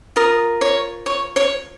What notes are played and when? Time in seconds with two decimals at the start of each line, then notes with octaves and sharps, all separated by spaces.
0.16 F4 A#4 D#6
0.61 C#5 C#6
1.06 C#5 C#6
1.36 C#5 C#6